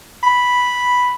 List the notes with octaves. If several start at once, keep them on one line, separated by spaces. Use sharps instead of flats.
B5